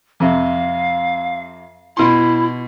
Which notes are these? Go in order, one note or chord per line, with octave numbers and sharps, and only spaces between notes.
F2 C3 F5
B2 E4 C6